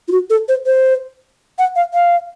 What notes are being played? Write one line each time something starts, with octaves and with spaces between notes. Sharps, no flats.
F4
F#4
A4
C5
C5
F#5
F5
F5